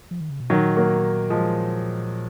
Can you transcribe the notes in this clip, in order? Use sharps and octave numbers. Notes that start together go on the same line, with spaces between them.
F3
D#3
C#3
B2
A#2 D#3 F#3
F#3 A#3
F3 G#3